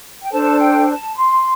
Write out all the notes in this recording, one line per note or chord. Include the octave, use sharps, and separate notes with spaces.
G5
D4 A4 C5 A5
G5
A5
C6